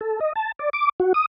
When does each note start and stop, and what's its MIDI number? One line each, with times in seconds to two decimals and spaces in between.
0.01 0.20 69
0.20 0.33 75
0.36 0.52 81
0.59 0.70 74
0.73 0.89 86
1.00 1.13 66
1.14 1.26 87